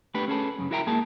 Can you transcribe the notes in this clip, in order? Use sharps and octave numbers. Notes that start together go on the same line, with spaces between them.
A3 B3 D4 G4 B4
C#4 G#4 A4 B4
F#2 C#3
E4 F#4 A#4 E5 G5 A#5
G#2 A#3 G#4 A#4 A5